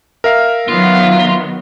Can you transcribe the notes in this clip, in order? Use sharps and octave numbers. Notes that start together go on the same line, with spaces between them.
A#4 E5 F5
D#3 F#3 B3 F4